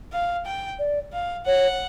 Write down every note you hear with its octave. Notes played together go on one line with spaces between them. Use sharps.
F5
G5
D5
F5
C#5 F#5